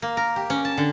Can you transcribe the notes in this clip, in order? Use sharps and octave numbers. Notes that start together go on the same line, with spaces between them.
A#3
A#4
G4
C#4
A5
D3